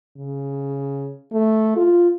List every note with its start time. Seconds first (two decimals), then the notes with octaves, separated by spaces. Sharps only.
0.17 C#3
1.33 A3
1.77 F4